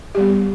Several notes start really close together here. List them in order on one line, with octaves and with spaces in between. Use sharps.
G4 G3 B3